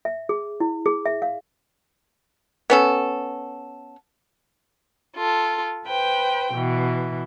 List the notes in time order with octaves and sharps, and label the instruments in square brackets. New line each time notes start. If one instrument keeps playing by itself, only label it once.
[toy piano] E5
G#4
E4
G#4
E5
F5
[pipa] B3 C#4 A4
[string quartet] F4 A4
B4 C5 G5
B2 E3